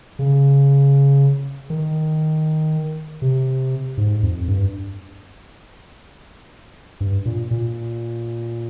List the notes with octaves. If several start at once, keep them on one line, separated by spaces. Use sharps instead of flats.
C#3
D#3
C3
G#2
F2
G2
G2
A#2
A#2